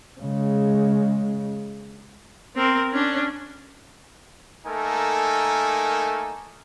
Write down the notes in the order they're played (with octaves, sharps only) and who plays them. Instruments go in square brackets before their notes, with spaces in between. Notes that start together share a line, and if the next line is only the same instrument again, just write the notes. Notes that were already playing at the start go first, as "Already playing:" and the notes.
[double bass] C#3 G#3
[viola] C4 A#4
C#4 D4
[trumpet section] A3 A#3 D#4 A4 A#4 G#5